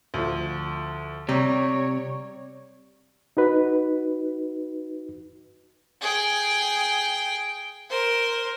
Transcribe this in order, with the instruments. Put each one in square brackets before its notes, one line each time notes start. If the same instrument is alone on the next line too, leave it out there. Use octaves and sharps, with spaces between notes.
[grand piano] D2 F3
[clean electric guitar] C3 [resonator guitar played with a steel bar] G3 [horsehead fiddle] C#5 [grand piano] A#5
[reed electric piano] D#4 F#4 B4
[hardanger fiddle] G#4 G5
A#4 C5